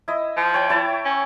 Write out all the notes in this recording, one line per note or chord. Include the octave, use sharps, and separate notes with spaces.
E4 D#5
F3
C#5 G5
E4 C#5 A5
C#4